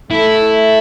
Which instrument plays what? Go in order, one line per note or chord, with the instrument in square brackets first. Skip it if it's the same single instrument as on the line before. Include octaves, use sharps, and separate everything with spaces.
[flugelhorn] A3 [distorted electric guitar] E4